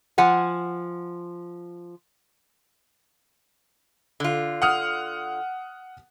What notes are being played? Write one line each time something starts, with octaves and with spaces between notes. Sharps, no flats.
F3 F#5 G#5
D3 F4
F#5 D#6 F6